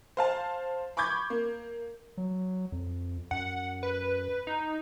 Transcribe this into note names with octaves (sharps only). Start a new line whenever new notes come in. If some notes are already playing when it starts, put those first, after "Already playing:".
C5 F5 A5
B5 C#6 D6 G6 G#6
A#3
F#3
F2
F#2 F#5
B4
D#4